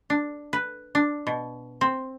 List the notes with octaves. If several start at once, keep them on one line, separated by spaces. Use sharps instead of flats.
D4
B4
D4
B2
C4